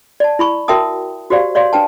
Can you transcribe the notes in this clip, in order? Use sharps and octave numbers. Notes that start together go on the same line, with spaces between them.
D5 A5
E4 B5 C#6
F#4 A#4 E5 G5 A5 D#6
F#4 G4 C5 D5 F5
C#5 D5 F5 C6
D4 B4 G5 A5